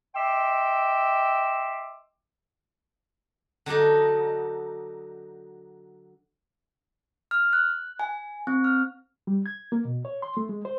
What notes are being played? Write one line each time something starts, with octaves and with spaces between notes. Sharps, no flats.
D#5 E5 G5 C6 D6 E6
D3 F#3 D4 D#4
F6
F#6
G#5
C4
F6
G3
G#6
A#3
B2
C#5
C6
A3
G#3
C5